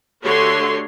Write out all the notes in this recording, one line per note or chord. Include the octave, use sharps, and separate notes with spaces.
D3 A3 F#4 G4 C#5 C6